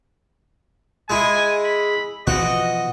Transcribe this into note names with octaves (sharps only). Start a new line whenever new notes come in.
G#3 E4 G#5
B5
B2 E3 F3 F#4 D#5